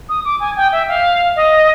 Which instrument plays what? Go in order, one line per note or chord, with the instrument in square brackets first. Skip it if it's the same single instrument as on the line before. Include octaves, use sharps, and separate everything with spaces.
[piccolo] D#6
D6
G#5
G5
E5
F5
D#5